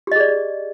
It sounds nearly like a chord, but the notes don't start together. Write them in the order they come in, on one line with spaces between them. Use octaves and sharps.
G4 D#5 G#4 D5